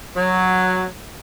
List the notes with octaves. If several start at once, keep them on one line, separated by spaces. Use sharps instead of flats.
F#3